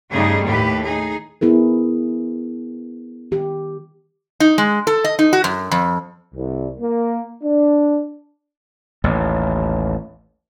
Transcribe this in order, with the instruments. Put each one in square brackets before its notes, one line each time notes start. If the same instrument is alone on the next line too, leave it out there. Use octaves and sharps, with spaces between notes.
[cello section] G2 C#3 G3 A3 D#4 G#4
D#2 A2 G4 B4
D#4 G#4
[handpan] B3 E4 G#4 A#4
D#3 G4
[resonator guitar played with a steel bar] D#4
G#3
A4
D#5
D#4
F#4
F#2
F2
[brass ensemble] C2
A#3
D4
[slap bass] A1 D#2